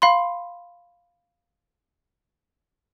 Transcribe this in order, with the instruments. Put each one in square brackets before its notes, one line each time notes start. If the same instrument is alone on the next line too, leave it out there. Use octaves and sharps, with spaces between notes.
[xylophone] F5 B5 C6